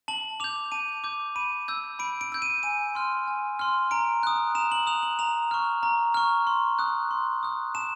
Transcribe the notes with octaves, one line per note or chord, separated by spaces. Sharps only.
A5 F#7
D6 G6 F7
A5 D#7
D6 G6
B5 D#7
E6 G6
B5 D7
D7
E6 G6
D#7
G#5 D#7
C6 F6
G#5
C6 F6
A#5 D7
D#6 F#6
A#5 E7
F#7
D#6 F#6 F7
F#7
A#5 F7
C#6 F6
A#5
C#6 F6
C6
D#6 F#6
C6
D#6 F#6
A5 E7